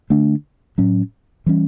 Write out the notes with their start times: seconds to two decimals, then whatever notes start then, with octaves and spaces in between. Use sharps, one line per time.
0.10 D3 A3 D4
0.78 A2 F#3 C#4
1.46 E3 G3 C#4